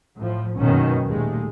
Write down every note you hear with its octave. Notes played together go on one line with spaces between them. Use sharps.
A2 F3
F#1 F#2 B2 D#3 B3 C#4
D#2 A#2 G#3 A3